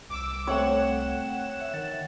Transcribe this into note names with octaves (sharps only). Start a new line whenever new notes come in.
C2 D6 E6
A3 C4 C#5 F#5 G5 E7
E5
D#3 A6